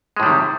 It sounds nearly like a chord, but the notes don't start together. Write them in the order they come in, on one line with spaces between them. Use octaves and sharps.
G#3 A2 G3 D#3 C3